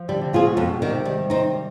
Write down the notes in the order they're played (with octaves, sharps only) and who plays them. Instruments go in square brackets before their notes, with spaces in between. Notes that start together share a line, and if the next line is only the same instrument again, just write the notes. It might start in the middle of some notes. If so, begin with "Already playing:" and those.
Already playing: [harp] F3
[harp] D3 [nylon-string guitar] G3
[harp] C3
[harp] B2 [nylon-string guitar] C4 F4 G#4
[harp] G#2
[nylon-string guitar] F2 [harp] B2
[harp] B2
[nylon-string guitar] D#3 G3
[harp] C3
[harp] D#3 [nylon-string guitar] G3
[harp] G3
[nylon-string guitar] C4 D#4
[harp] G3